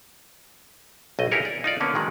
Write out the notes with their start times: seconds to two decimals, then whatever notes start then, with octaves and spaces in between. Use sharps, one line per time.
1.19 B1 A3 D#5
1.31 E4 G4 G#4 A#4 C#5
1.45 D5
1.64 D#4 F4 D5
1.80 D3 A#3 B3 C#4
1.95 D#3 F#3 G#3